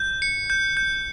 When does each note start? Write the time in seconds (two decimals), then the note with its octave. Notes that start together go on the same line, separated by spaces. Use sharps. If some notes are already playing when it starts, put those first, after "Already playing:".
Already playing: G6
0.22 C#7
0.50 G6
0.77 G6